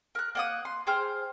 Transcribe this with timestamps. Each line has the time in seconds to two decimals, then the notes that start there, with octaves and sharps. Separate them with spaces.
0.15 A#4 F#6
0.35 A#3 F#5 D#6
0.65 C6
0.87 G#4 C5 G5 F6